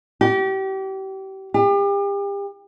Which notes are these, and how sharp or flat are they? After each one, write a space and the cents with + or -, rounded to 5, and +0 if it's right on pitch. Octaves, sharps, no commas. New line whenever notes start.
G4 -30
G4 +35